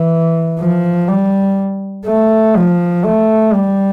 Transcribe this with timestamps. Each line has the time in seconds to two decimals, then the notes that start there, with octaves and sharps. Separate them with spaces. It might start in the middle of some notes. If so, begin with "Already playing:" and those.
Already playing: E3
0.59 F3
1.08 G3
2.07 A3
2.56 F3
3.04 A3
3.53 G3